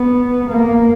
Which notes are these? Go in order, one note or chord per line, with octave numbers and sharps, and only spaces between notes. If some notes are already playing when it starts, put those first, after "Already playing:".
Already playing: B3
A#3